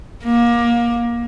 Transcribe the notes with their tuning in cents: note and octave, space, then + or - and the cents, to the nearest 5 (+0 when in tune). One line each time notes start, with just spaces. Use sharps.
A#3 +25